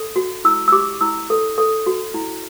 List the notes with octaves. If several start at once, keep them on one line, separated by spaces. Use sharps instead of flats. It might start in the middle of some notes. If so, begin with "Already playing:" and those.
Already playing: A4
F#4
E4 E6
E6
G4 D6
E4 E6
A4
A4
F#4
E4